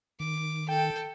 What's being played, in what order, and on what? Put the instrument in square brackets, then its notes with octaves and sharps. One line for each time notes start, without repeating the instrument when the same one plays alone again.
[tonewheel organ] D#3 [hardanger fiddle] D6
[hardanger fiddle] A4 [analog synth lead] G5